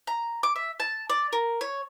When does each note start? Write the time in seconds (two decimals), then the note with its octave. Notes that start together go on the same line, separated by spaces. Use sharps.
0.07 A#5
0.43 D6
0.56 E5
0.80 A5
1.10 D5
1.33 A#4
1.61 C#5